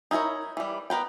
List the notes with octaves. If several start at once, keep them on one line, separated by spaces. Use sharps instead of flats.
D#4 E4 A4 A#4 C#5
E3 G3
B3 A#4 B4 G5